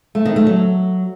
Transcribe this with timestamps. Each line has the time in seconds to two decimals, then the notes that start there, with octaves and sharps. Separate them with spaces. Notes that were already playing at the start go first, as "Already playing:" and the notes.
0.15 A3
0.25 D#3
0.36 A3
0.47 F#3